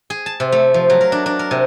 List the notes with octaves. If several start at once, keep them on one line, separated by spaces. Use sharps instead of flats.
G#4
A5
C3
A3
F3
F#3
A#4
D4
D4
A#4
C3